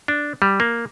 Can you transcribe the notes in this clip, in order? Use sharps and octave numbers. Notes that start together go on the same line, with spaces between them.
D4
G3
A#3